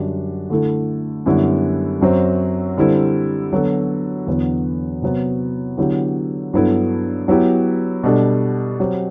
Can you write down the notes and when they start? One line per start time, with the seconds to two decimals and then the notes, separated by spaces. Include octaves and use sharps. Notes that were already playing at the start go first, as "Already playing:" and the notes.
Already playing: F#2 D3 G3 D4 F#4
0.50 D3 A3 E4 A4
1.26 F#2 D3 G3 B3 E4
2.01 F#2 F#3 C4
2.77 D3 G3 C4 E4 A4
3.52 D3 F#3 B3 F#4 A4
4.27 E2 D3 F#3 B3 F#4
5.02 C3 F#3 B3
5.77 D3 F#3 B3 E4 G4
6.53 G2 F#3 B3 E4 A4
7.28 F#3 B3 E4 G4
8.03 B2 G3 D4 A4
8.80 F#3 C4 G4